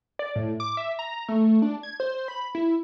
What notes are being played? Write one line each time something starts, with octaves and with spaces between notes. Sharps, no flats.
D5
A2
D6
E5
A#5
A3
D4
G#6
C5
B5
E4